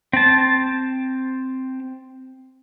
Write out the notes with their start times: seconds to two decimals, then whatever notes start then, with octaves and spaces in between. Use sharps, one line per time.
0.13 C4 A5